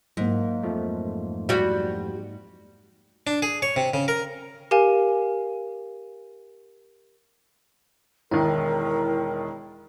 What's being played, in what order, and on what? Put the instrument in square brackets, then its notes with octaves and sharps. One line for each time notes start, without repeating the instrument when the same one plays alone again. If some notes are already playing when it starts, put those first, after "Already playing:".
[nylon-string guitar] G#2 [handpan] F#3 A#3
[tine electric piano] F2 F3 A3
[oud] G3 F#4
[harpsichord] D4
G#4
C#5
C3
C#3
A#4
[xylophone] G4 A#4 F5 G#5
[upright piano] E1 D#3 [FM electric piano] E4 [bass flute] A#4